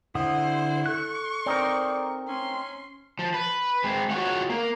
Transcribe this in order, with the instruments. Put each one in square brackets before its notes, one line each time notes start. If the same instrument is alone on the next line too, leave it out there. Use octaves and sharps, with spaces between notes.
[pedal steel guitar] D3 F#5 D#6 [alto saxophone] E4 [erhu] C5
[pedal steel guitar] A4 F#6 [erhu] C#6
[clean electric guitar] C4 D#4 A#4 [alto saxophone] D5
[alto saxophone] C#4 [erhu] C6
[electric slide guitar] F3
B4
G#3 C4
F4 F#4 G#4 C#5 F#5
A#3